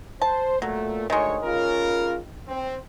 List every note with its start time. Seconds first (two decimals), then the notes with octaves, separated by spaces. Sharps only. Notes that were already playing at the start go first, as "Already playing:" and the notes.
0.22 C5 A5
0.62 A#2 F#3 A3
1.10 D2 D#3 G#3 C#5
1.43 C#3 F4 A#4
2.48 C4